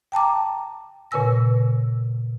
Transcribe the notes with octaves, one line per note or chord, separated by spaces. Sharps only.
G5 A5 A#5 D6
A#2 C#3 B4 G#5 E6 A#6